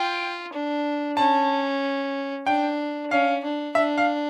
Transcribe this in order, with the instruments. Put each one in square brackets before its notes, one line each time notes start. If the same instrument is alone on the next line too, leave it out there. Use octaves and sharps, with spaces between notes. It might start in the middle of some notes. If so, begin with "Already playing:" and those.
Already playing: [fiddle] F4 [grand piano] G5
[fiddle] D4
[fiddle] C#4 [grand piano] A5
[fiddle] D4 [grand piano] G5
[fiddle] C#4 [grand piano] F5
[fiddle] D4
[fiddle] D4 [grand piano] E5
[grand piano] F5